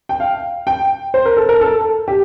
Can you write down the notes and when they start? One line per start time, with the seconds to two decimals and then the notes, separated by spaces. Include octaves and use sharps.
0.09 G5
0.20 F5
0.67 G5
1.14 C5
1.26 A#4
1.37 A4
1.49 A#4
1.61 A4
2.08 G4